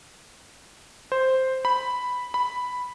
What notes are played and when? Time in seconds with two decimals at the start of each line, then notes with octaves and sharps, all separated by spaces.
1.12 C5
1.65 B5
2.34 B5